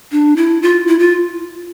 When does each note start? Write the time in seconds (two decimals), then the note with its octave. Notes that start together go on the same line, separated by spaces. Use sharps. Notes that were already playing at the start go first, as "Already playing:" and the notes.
0.12 D4
0.37 E4
0.62 F4
0.87 E4
0.99 F4